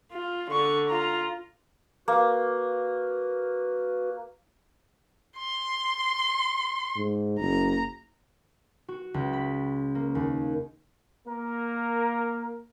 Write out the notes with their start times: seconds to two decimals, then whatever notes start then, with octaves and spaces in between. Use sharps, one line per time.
0.12 F4
0.52 D3 C#6
0.90 F4 A#5
2.08 A#3 F#4 B4
5.37 C6
6.97 G#2
7.40 F#1 A#5
8.88 F#4
9.14 C#2
9.33 B5
9.95 A#3
10.15 D#2
11.26 A#3 A#4